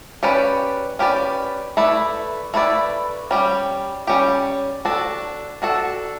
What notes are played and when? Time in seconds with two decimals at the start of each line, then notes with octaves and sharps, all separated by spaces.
0.23 C#4 G4 B4 D5
0.99 C#4 G4 B4 D5
1.77 A3 E4 B4 D5
2.54 A3 E4 B4 D5
3.31 G3 C#4 G4
4.07 G3 C#4 G4
4.85 D4 F#4 A4
5.62 D4 F#4 A4